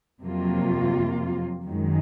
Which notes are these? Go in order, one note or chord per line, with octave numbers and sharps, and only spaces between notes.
F2 C3 F#3 A#3 F4
F#2 D#3 G#3